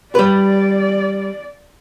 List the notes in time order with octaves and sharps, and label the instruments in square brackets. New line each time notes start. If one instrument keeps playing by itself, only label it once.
[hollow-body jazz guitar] G3 B4 [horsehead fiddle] D5